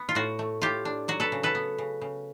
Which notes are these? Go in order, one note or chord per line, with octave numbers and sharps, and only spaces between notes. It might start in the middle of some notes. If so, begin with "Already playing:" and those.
Already playing: B3
F4
A2 F#4
A3
A2 F4 G4
D4
F#3 F#4
A4 B4
C#3
A4 B4
B3
C#3
C#3